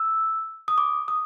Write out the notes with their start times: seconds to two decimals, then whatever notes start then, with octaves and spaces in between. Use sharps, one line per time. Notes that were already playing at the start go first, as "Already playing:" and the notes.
Already playing: E6
0.68 D#6
0.78 D6
1.08 D#6